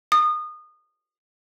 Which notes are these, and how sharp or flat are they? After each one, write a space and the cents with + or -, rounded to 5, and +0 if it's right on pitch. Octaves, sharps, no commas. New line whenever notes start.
D#6 -25